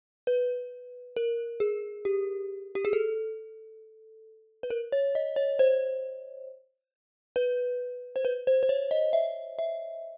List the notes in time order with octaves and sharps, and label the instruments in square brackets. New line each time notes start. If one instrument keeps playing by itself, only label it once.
[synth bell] B4
A#4
G#4
G4
G4
G#4
A4
B4
A#4
C#5
D#5
C#5
C5
B4
C5
B4
C5
C5
C#5
D#5
E5
E5